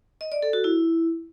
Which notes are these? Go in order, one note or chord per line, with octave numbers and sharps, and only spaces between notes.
D#5
D5
A4
F#4
E4